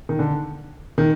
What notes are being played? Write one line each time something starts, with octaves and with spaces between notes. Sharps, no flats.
D#3
D3
D#3